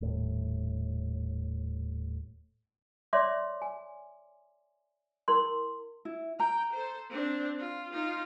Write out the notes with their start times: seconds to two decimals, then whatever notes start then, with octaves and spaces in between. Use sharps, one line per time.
0.01 D#1 A2
3.13 C#5 D5 E5 C6 D6
3.62 G#5
5.28 E4 A#4 C6
6.05 E4
6.40 G5 A#5
6.73 A4 C5
7.10 C4 D4
7.58 F4
7.92 D#4 F4